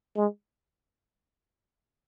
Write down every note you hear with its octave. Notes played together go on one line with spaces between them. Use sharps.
G#3